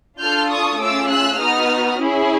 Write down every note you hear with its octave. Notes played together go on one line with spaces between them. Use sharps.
D4 F4 A4 F6 G6
C#6 D#6
A3 C#4 F4 G#4 D6 E6
E6 F#6
B3 D#4 F#4 D#6 F6
C#4 E4 G#4